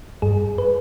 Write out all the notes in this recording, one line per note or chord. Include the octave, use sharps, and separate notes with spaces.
G2 G#4
B4